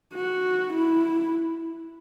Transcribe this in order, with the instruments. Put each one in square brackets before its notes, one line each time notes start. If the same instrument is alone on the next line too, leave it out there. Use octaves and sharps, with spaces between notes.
[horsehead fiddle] F#4
E4